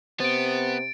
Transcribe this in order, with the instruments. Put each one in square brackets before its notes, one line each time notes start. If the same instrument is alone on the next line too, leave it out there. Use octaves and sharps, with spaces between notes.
[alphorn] C3 [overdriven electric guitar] B3 [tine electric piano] C5 [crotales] A6 D7